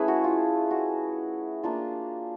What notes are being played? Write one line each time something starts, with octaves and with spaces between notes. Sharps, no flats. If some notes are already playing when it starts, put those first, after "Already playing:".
Already playing: A3 C#4 E4 G#4 B4
F#4
F4
F#4
A#3 D4 F4